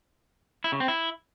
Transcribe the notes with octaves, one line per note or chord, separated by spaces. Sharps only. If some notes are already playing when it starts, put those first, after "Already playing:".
E4
C#3
C4
E4